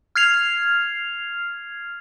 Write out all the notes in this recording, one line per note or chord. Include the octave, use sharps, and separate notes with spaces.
F6 G#6 C7 F7